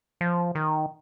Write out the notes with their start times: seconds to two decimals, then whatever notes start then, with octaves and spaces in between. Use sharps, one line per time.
0.21 F3
0.55 D#3